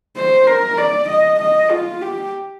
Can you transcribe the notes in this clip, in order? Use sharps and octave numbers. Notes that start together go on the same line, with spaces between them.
C5
A#4
D5
D#5
D#5
F4
G4